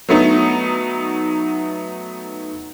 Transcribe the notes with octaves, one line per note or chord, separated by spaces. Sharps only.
F#3 A3 B3 D#4